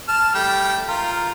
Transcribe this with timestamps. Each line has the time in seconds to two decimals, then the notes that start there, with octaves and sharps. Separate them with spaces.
0.08 A5 F6
0.35 G3 A3 G5
0.88 F4 A#4